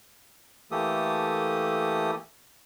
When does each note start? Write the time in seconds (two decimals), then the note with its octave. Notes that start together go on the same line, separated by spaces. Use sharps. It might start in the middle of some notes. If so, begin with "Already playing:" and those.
0.71 E3 A3 A#3 G4 A4 D#6